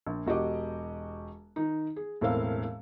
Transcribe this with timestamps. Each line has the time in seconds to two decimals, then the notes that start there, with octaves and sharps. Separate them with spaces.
0.07 A#1
0.26 E1 F#4 G4 D#5 D6
1.56 D#3 D#4
1.96 G#4
2.21 E1 A2 A#3 C4 F5 E6